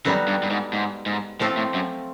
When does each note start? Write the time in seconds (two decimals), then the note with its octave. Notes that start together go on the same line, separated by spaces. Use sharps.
0.05 F#2 G3 B3 D#4 F#4 A4
0.28 G2
0.43 G2
0.50 G#2
0.73 G#2
1.06 G#2
1.40 A2 F3 A3 C4 F4 A4
1.57 A2
1.74 F#2